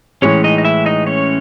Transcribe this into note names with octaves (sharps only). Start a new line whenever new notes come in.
A2 E3 G#3 C#4 C#5
D#4 D#5
D#5
E4 E5
D#4 D#5
C#4 C#5